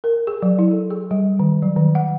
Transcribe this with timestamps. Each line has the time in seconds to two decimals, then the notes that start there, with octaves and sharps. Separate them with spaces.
0.04 A#4
0.27 G#4
0.42 F#3
0.59 E4
0.71 A4
0.90 G#4
1.11 G3
1.39 D#3
1.62 F#3
1.77 D#3
1.95 F#5